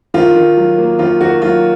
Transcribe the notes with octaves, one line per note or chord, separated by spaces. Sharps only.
D#3 F4
D#3
F#3
A#3
D#3 F4
D#3 F#4
F#3 F4